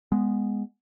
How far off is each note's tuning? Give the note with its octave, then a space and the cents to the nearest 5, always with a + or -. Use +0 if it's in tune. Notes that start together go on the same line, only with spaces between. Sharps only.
G#3 -5 B3 +0